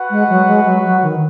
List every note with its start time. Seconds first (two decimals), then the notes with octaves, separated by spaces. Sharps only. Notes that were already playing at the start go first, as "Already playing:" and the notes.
Already playing: F#4 B4 F#5
0.11 G#3
0.30 F#3
0.48 G#3
0.66 F#3
0.84 F#3
1.03 D#3